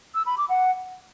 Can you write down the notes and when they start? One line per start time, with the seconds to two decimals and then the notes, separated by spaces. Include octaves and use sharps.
0.15 E6
0.26 B5
0.38 D6
0.49 F#5